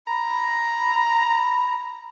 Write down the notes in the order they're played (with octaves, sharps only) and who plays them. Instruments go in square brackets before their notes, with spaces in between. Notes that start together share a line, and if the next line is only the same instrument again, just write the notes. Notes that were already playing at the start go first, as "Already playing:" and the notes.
[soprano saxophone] A#5 [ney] B5